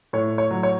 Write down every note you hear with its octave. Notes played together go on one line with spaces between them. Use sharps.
A2 C#5
C#5
F#3
C#5